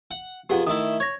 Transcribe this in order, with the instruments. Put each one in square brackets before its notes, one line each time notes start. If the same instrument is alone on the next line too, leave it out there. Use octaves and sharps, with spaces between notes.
[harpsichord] F#5
[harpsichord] F2 B3 [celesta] G4 G#4 F#5
[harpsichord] D#3 A3 E4 [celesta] D#6
[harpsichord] C#5 [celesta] G#6 A#6